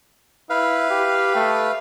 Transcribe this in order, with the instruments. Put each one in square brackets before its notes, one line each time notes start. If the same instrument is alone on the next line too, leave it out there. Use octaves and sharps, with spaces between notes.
[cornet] E4 [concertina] B4 F5
[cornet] G4
A3